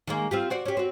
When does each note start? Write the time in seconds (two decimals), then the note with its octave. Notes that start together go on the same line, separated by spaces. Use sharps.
0.07 D#3 G#3 A#3
0.31 C4 F4 G4
0.50 F#4 C5 D5
0.65 C#4 G4
0.77 C4 F#4